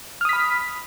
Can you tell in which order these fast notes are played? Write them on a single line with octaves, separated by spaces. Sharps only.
F6 D#6 B6 B5